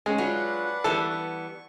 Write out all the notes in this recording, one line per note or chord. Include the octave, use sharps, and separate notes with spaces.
G#3 C#4
F#3 D4 F4 B4 F#5
E3 G3 B3 A4
C#6